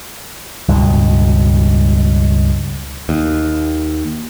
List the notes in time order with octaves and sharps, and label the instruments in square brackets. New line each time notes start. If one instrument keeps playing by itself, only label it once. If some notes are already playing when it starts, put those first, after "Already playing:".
[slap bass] C#2 G2 B2 G#3
[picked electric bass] D#2